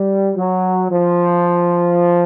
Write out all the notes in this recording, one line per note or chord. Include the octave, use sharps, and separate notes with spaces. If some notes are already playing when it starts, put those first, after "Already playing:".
Already playing: G3
F#3
F3